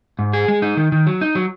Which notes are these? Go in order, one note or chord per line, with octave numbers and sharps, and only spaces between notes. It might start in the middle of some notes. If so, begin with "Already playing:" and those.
G#2
G#4
G#3
D#4
D#3
D#3
F#3
D#4
F#3